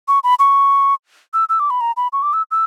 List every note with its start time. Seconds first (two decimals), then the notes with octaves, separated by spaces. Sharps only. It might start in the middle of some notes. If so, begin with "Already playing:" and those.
0.08 C#6
0.24 B5
0.39 C#6
1.34 E6
1.49 E6
1.60 D6
1.70 B5
1.81 A#5
1.97 B5
2.13 C#6
2.23 D6
2.33 E6
2.51 E6